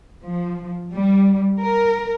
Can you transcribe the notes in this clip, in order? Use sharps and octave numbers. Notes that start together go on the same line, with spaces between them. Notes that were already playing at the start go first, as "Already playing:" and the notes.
F3
G3
A#4